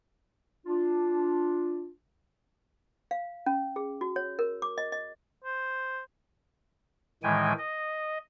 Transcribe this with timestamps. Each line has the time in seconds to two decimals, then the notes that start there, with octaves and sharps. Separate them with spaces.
0.66 D4 F4
3.11 F5
3.46 C#4
3.76 G#4
4.01 F#4
4.16 C#5
4.39 A#4
4.62 D6
4.78 D#5
4.92 D#5
5.44 C5
7.23 A2 D#3 E3 G#3 G5 G#5
7.58 D#5